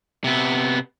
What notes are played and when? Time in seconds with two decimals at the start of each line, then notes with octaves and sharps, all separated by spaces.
0.24 C3 B3